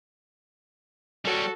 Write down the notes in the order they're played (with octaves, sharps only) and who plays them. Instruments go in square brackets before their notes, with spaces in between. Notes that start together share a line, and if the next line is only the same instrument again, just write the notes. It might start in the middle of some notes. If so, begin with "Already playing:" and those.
[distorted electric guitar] G3 C#5 [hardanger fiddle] F#4 A4